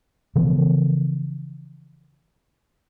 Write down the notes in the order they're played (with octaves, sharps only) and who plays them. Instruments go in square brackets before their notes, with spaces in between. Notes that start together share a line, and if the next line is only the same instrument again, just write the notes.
[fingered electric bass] C#3 E3 F3 B3